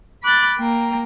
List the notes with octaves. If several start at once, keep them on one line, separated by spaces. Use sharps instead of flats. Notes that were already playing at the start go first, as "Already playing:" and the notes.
B5 D6 F#6 G6 A6
A#3 G5 A#5